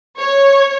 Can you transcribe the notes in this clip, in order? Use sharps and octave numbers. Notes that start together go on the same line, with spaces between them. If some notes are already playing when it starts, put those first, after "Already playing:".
C#5